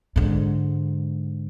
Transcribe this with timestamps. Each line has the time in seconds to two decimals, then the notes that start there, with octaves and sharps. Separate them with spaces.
0.16 G#2 D3